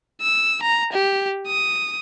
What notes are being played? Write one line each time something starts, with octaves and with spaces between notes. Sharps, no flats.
E6
A#5
G4
D#6